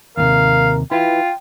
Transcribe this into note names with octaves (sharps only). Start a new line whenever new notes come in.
D#2 A2 C3 A#4 F5
E4 F4 B4 G5